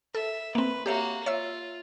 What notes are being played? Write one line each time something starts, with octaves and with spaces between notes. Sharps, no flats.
A4 E5
A#3 C4 B4
A#3 F#4 G4 C#5 E5
F4 C#5 E5 E6